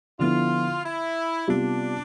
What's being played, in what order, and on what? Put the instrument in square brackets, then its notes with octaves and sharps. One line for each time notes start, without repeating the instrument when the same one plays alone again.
[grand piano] D3 F3 B3 E4 [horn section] F4
[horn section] E4
[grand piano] C3 G3 B3 F4 [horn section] D4